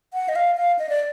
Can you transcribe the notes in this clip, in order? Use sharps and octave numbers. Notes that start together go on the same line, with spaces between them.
F#5
D#5
F5
F5
D#5
D5